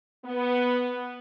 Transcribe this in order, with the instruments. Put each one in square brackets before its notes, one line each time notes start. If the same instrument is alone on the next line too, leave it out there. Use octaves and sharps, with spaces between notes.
[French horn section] B3